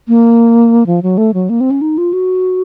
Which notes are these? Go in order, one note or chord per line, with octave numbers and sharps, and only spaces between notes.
A#3
F3
F#3
A3
F#3
A#3
C4
C#4
D#4
F4
F#4